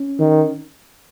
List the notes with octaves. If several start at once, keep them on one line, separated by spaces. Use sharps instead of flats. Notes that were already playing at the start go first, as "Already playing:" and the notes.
Already playing: C#4
D#3